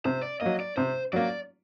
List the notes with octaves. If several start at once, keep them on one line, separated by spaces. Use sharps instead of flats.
C3 C5
D5
F#3 A#3 D#5
D5
C3 C5
F#3 A#3 D5